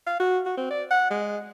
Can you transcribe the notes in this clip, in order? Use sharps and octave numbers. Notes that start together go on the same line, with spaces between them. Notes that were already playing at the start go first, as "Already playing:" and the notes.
F5
F#4
F#4
C4
D5
F#5
G#3